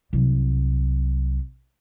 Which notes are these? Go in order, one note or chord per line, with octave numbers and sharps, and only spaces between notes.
C2 F#3